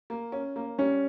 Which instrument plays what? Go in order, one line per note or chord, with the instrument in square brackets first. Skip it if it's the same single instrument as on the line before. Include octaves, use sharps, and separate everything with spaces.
[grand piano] A#3
C#4
A#3
[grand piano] G3 [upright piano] C#4